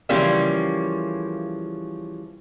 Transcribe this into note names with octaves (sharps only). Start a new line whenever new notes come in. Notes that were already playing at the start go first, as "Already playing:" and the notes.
C#3 E3 F3 G3 A#3 C#4